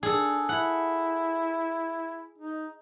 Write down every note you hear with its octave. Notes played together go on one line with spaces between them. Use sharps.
D4 G#4 A4
E4 F#5
D#4